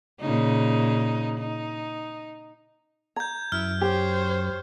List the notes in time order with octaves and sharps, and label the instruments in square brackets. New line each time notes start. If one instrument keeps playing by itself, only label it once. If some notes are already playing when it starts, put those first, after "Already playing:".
[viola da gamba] A#2 C#3 D#4
D#4
[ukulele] A#5 [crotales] G6 G#6
[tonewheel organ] F#2 [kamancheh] E4 [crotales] F6
[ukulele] G4 [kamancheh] C5 C#5